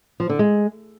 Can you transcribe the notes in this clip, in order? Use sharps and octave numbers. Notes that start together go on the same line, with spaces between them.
F3
D3
G#3